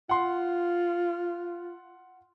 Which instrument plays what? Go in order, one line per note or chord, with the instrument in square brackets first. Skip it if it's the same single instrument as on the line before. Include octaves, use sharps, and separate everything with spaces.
[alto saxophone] F4 [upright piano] F#5 C6